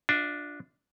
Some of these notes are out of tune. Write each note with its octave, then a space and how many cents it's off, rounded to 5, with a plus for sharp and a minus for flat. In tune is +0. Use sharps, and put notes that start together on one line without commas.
D4 +0 F4 +20 E5 -35